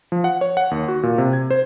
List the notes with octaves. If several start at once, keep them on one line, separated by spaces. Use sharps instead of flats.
F3
F#5
C#5
F#5
D#2
F#4
A#2
C3
G#6
C5